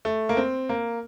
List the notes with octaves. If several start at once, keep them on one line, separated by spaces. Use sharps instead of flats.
A3
A#3
C4
A#3